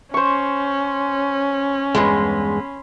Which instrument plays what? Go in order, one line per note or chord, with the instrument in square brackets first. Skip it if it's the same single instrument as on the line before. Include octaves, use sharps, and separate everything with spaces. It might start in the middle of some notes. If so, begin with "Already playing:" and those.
[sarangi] C#4 [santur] C5 C#6
[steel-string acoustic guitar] E2 G2 G#3 [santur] B5 C6